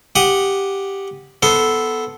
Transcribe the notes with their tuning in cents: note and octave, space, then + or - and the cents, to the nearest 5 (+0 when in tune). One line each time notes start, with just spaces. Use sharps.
G4 +0 F#5 -5 D#6 +0
B3 +0 A4 -5 C5 +0